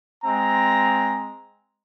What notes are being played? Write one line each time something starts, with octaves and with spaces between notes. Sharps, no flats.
G#3 C4 A#5